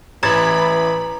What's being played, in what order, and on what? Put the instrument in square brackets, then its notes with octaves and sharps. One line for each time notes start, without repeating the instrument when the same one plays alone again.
[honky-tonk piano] A1 G#6 A6 [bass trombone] E3 [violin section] B4 B5 [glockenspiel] A#5